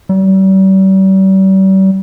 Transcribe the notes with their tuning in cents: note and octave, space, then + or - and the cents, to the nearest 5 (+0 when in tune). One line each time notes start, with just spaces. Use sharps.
G3 -40